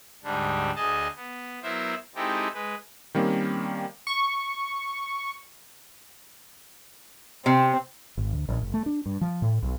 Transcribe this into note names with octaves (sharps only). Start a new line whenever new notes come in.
D2 G#2 D3 G3 D4
D2 G#4 D#5 A5
B3
F#3 B3 E4 A#4 C5 E5
G#3 C4 D#4 E4 G4 A4
G#3 B4
D#3 G3 A#3 C4 C#4
C#6
C3 C4
G#1
D2
A#1
F#1
A3
D4
G2
F3
A2
B1